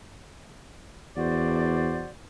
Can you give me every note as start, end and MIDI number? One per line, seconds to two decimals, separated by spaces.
1.17 2.06 40
1.17 2.09 66
1.17 2.09 72
1.17 2.09 74